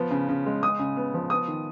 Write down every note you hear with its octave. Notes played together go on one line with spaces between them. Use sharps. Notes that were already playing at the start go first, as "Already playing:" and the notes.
Already playing: F3 B3
C#3
C#3
G#3
G#3 D#6
C#3
B3
F3
B3 D#6
D#3